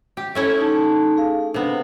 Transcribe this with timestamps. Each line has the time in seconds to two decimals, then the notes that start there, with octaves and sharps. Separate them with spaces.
0.17 G4
0.35 A3 C#4 E4
0.58 D#4 A5
1.17 G#4 F5
1.54 C3 B3 D4